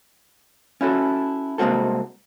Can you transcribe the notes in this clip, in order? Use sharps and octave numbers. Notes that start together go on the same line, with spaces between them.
C#4 E4 F#4 A4
C2 G#3 A#3 C4 F#4 A4